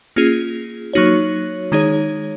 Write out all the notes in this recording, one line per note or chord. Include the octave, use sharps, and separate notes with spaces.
A#3 C#4 F4 G#4
F#3 A#3 D#4 F#4 C#5
D#3 G#3 D#4 G#4 C#5